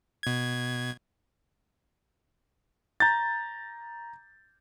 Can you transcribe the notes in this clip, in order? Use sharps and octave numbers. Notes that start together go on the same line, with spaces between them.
B2 G#6
A#5 G6 A6